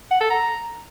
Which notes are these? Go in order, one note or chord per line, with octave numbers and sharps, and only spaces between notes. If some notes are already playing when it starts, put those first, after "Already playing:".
F#5
A4
A#5